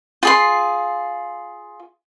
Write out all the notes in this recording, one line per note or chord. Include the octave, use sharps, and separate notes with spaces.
F4 G#4 C6